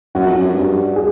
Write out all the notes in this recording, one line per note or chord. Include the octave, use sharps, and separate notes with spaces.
F#2 F#4
F2
F#2
F#2
G2
G#4